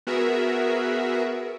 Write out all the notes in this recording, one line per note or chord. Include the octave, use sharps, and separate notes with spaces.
B3 F#4 G#4 A#4 E5